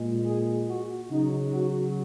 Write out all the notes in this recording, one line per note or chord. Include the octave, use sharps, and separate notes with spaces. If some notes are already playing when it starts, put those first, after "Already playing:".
Already playing: A#2 G#3
G#4
F#4
C#3 F#3 D#4
F#4